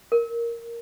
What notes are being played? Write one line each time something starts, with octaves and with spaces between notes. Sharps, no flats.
A#4